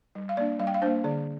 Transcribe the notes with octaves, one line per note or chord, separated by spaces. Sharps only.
G3
F5
A#3 D4 D5
G3 F5
G5
F5
A#3 D4 C5
D3 D5